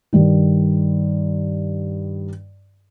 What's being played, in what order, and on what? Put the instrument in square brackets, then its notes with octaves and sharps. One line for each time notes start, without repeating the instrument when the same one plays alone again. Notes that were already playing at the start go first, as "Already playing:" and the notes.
[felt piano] G2 D#3